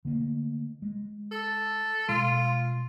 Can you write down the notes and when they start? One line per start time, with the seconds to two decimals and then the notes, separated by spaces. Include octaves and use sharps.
0.05 D3 A3 A#3
0.82 G#3
1.31 A4
2.09 B2 G#3 F4